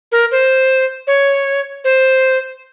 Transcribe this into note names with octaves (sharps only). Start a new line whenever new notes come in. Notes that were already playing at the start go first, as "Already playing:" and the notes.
A#4
C5
C#5
C5